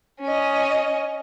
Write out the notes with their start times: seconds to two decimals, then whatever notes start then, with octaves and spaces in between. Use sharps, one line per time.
0.21 C#4 D#5